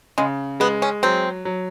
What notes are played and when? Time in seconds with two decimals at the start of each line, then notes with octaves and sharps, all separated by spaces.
0.18 C#3 G#3
0.60 G#3 B3
0.82 C#4
1.03 F#3 C4
1.45 F#3